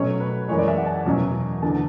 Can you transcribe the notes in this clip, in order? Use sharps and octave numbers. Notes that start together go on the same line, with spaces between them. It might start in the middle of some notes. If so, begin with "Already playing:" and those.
Already playing: B2 F#3 A3 C#4 C#5
B4
F#2 E3 G#3 C#5
D5
E5
F#5
A5
E2 B2 F#3 C#4
E2 D3 A3 A5